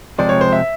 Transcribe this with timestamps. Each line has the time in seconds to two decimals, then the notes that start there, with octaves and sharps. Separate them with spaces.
0.18 C3 F3 G#3 C4 D5
0.29 C#5
0.41 C5
0.52 E5